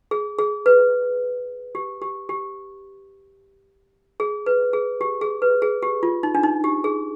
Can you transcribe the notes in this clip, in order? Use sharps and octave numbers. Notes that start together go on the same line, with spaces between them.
G#4
G#4
B4
G4
G4
G4
G#4
B4
G#4
G4
G#4
B4
G#4
G4
F4
D#4
D4
D#4
G4
G#4